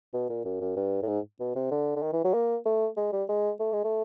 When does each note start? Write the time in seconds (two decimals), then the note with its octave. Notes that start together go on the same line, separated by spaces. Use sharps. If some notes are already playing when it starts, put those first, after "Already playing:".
0.14 B2
0.30 A#2
0.45 F#2
0.61 F#2
0.76 G2
1.03 A2
1.08 G#2
1.40 B2
1.56 C3
1.71 D3
1.96 D3
2.02 D#3
2.13 E3
2.24 F#3
2.34 A#3
2.66 A3
2.97 G#3
3.13 G3
3.29 G#3
3.60 A3
3.73 G#3
3.84 A3